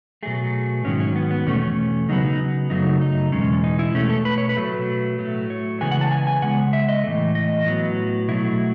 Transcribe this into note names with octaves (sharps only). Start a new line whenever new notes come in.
B2 F#3 A3 G#4
G#2 D#3 F#3 C#4
C#4
B3
B3
E2 B2 A3 C#4
C#4
C#3 F#3 B3 D#4
D#4
F#2 C#3 F#3 A3 D#4
D#4
E2 B2 G#3 C#4
D#4
E4
B2 A3 C#4
A4
B4
C#5
B4
B2 F#3 A3
A2 F#3 A3
C#5
C#3 E3 G#3 B3 G#5
F#5
A5
G#5
G#5
C#3 G#3 B3 F#5
E5
D#5
A2 E3 A3
D#5
A2 F#3 B3
B2 F#3 A3 E4